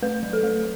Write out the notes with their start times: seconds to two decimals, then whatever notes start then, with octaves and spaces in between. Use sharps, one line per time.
0.02 A3 B4
0.23 F#3
0.33 A4
0.43 A3